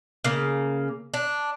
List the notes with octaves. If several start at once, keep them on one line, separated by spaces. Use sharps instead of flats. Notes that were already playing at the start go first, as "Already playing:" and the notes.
C#3 A#3
D4